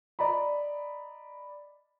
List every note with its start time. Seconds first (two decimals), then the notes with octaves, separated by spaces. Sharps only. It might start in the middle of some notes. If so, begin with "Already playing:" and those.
0.19 D5 D#5 A#5 B5